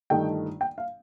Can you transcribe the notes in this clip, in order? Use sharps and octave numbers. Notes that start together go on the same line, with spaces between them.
G1 G2 D#3 A3 D#4 G5
G5
F5